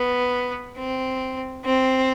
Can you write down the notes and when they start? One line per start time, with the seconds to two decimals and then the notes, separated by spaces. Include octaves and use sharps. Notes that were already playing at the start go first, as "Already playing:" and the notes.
Already playing: B3
0.78 C4
1.65 C4